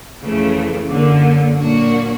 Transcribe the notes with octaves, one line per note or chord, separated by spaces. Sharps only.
F2 C#3 E3 A3
F#2 D3 F#3 A#3
A#2 F#3 A#3 D4 F#4